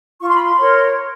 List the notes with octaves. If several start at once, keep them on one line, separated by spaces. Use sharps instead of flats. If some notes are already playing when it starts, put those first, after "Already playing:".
F4 C#6
C6
B5
C6
A#4 C#5